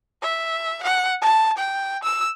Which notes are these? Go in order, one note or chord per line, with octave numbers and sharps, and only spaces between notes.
E5
F#5
A5
G5
E6